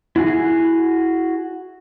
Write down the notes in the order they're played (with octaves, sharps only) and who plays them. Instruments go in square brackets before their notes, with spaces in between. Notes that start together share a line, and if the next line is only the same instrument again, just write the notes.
[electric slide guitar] E4 F#4 G#4 G#5